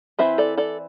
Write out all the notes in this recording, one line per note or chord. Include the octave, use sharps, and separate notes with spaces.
E3 C4 E4 C5 E5
A4 D5
A4 D5